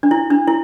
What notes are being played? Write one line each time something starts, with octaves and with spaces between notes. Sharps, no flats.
D4
E4
D4
E4